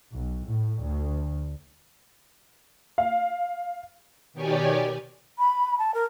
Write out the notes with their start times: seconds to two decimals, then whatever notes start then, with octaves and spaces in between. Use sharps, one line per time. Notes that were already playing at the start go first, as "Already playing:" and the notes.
0.12 B1
0.45 A2
0.83 D2
2.98 F5
4.33 B2 D#3 G4 C#5 D5 G#5
5.38 B5
5.79 A5
5.94 A#4